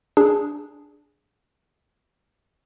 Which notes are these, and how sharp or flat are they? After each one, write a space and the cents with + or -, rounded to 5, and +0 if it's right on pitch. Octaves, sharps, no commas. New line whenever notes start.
D4 +0 G#4 +0